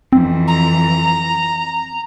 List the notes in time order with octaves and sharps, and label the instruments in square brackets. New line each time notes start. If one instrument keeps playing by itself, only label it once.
[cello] F2 E3 [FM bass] C4
[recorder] A#5